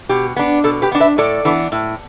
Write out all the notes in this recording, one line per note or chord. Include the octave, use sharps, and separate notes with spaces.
B2 G4
B3 D4
B2 A4
G4 B4
B3 D4
B4 E5
A2 A4 D5
E3 B3 D4
A2